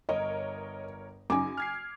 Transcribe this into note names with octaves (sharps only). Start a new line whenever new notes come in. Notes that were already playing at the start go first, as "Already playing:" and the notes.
G1 A#4 C#5 D#5
F#2 C#3 D#4 G#5 D6
F6 G#6 C7